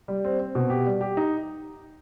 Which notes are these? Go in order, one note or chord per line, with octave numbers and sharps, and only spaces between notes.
G3
C4
C4
B2
G4
G3
G4
D#4